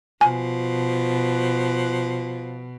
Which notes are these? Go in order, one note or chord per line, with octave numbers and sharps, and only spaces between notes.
B2 F3 G#5